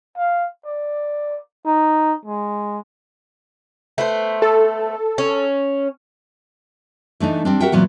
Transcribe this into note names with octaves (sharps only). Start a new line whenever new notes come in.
F5
D5
D#4
G#3
A3 B3 C5
A4
C#4
E3 A3 D4 D#4
G3 C4 D4
F#4 G4 A#4 E5 F#5 G5
A#2 E3 F#3 B3